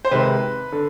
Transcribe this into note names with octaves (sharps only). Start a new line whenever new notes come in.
C5
C3 D#3 G#3 B4
D3